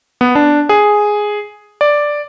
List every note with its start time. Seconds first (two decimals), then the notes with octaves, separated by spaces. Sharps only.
0.21 B3
0.35 D4
0.69 G#4
1.81 D5